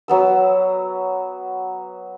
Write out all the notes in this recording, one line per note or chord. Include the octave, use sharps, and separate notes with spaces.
F#3 B3 E6